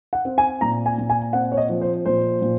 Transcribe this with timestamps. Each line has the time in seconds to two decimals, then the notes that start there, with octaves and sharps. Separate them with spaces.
0.13 F#5
0.25 C4
0.38 G#5
0.61 A#2 A#5
0.86 G#5
0.98 A#2
1.10 G#5
1.33 C4 F#5
1.52 C#5
1.57 D#5
1.69 F3
1.81 C5
2.06 A#2 C5
2.42 A#2